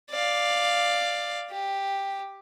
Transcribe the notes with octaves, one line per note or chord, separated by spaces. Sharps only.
D5 F5
G4